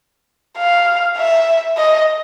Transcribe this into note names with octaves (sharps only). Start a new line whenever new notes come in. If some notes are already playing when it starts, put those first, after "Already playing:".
F5
E5
D#5